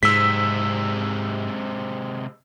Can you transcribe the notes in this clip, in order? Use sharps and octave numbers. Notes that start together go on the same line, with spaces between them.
G#2 C3 G#3 E6 B6